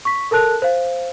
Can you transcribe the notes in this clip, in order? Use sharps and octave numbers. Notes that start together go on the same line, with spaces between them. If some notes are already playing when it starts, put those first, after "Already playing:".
C#6 B6
A4 A#4 A5 F#6
C5 F5